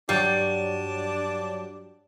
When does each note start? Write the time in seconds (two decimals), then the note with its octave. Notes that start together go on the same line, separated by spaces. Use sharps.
0.09 G2 F#3 G3 D4